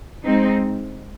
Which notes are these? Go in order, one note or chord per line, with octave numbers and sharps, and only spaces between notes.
G#3 C4 D#4